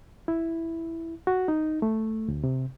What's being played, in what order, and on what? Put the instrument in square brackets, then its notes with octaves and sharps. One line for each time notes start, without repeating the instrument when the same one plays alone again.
[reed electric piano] E4
F#4
D#4
A3
D2
C3